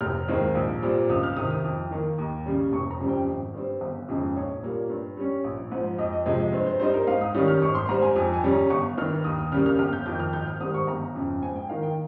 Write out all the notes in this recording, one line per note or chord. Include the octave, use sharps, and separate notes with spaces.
F1 F6
D#2 D#3 G#3 C4
A#1
A#2 G3 C4
C#2 D#6
F6
C3 D#3 D#6
D#6
F2
D#3 A#3
D#2
C#3 G3
F1 C#6
A#5
F2 C#3 G3 C4
G5
G#1
G2 G3 C4
G1
F2 C#3 G#3 D#4
A#1 C#5
A#2 G3 A#3
G2
G3 C#4
A#1
G#2 F3
F2 D#5
D#5
C3 F3 G#3 D#5
D#5
G2 C5
C5
G3 C4 D#4 C5
A#4
G#2 F5
D#6
D#3 G3 C#4 D#6
F6
G#1 C#6
C6
G#2 G3 C4 A#5
G#5
F2 G#5
G#5
C#3 G3 C#4
A#5
G1 C#6
G2 D#3 F6
D#2 D#6
D#6
C#3 G3 A#3 F6
F6
G1 F6
G6
F2 D#3 G6
F6
G#1 G6
F6
G#2 D#3 G3 C4 D#6
C#6
G1 A#5
F2 C#3
G#2 G#5
G5
D#3 A#3 D#4 F5
G5